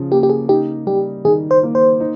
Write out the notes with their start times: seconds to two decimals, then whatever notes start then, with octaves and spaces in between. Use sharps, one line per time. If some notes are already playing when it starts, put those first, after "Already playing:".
Already playing: C#3 F3
0.11 A#3 G4
0.23 G4
0.30 G#4
0.49 D#4 G4
0.87 G3 G4
1.25 D#3 G#4
1.51 C5
1.63 A#3
1.75 C5
2.00 D#4